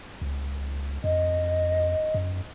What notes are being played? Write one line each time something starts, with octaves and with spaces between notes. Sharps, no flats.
C#2
F2 D#5
F#2